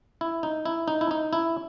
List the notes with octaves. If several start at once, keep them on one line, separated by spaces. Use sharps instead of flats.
E4
D#4
E4
D#4
E4
D#4
E4